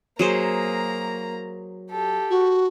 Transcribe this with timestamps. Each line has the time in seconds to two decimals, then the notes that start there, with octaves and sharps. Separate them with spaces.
0.19 F#3 A#3 G#4 C5 A#5
1.90 G4 A4
2.30 F#4